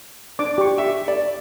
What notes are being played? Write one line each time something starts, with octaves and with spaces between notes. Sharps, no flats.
D4 D6
G4 C#6
E5
D5